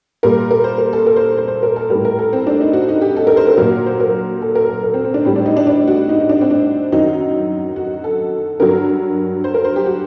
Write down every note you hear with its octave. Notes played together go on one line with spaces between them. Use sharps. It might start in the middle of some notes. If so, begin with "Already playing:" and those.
A#2 G3 A#4
A#4
C5
A#4
A4
A#4
C5
C5
C5
A#4
A4
A2 G3 A#4
A#4
A4
C4
D4
D#4
F#4
D#4
G4
A4
A#4
C5
A#4
A#2 F#3 A#4
C5
A#4
A4
A#4
A4
A#4
C4
C4
D4
A2 G3 C4
D4
D#4
D4
D4
F#4
D#4
D#4
D4
C4
D4
F#2 D#3 F#3 D#4
F#4
A4
G2 F#3 A#4
C5
A#4
C5
G4
F#4